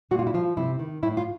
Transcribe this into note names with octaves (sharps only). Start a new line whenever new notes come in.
A#2 F#4
F4
E4
F3 F4
C3 E4
D#3
A2 E4
F4